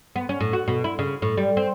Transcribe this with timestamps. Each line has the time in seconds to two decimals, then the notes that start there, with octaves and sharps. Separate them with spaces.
0.16 B3
0.29 C#4
0.40 A2
0.53 F#4
0.68 B2
0.84 E4
0.99 C#3
1.22 A2
1.37 G3
1.57 C4